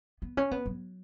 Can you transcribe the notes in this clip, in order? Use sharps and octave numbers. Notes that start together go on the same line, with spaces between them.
B3
C#4
B3
F#3